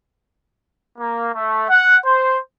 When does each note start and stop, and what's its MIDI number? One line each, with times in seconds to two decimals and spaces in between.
0.98 1.30 58
1.35 1.64 57
1.69 1.97 78
2.05 2.38 72